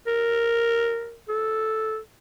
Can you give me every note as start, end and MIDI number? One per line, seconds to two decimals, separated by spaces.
0.07 1.17 70
1.29 1.98 69